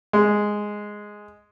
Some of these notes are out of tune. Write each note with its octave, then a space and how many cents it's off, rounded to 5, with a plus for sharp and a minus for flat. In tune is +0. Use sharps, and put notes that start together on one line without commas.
G#3 +0